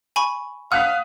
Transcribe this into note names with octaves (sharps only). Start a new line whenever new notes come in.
G#5 B5 C#6
F5 F#5 D#6 F#6 B6